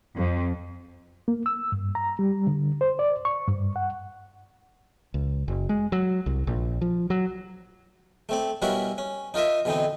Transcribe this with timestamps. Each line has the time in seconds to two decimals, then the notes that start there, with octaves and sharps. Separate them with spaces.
0.17 F2
1.28 A#3
1.46 E6
1.72 G2
1.95 A#5
2.19 G3
2.47 D3
2.81 C5
2.99 D5
3.25 C#6
3.48 G2
3.76 F#5
5.14 C#2
5.48 F#1
5.69 G#3
5.92 F#3
6.26 C2
6.47 A#1
6.81 F3
7.10 F#3
8.29 A3 C4 D5
8.62 B2 G3 C#4 E4 F#4 A#4
8.98 C#4
9.34 D#4 F4 A#4 D#5 E5
9.65 B2 D3 E3 C4 D#4